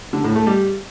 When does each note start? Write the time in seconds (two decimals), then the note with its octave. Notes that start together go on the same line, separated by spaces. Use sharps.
0.13 D3
0.24 A2
0.35 A3
0.47 G3